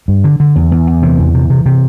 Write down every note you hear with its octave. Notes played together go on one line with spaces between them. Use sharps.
G2
D3
D3
E2
E2
E2
C3 E3
E2
C3
C3
C3